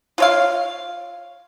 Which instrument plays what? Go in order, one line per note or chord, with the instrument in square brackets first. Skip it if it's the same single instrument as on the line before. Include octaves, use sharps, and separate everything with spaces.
[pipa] F4 C#5 F5